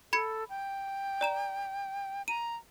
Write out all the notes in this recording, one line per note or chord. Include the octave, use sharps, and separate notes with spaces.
A4 B5 G#6 C#7
G5
D5 A#5 E7
A#5 D#7